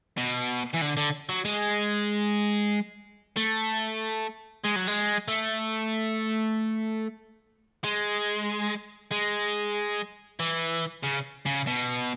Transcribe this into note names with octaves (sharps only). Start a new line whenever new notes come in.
B2
E3
D3
D3
F#3
G#3
A3
G#3
F#3
G#3
A3
G#3
G#3
E3
C#3
C#3
B2